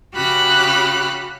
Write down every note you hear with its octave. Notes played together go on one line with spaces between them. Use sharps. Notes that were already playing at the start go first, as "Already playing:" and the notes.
C#3 F#4 G4 B5 F6 F#6